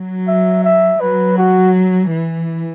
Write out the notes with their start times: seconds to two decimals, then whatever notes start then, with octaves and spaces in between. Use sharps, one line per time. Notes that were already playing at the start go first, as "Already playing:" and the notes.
Already playing: F#3
0.28 E5
0.64 E5
1.00 F#3 B4
1.38 F#4
2.11 E3